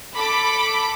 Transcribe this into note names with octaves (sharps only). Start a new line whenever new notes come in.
A4 B5 D6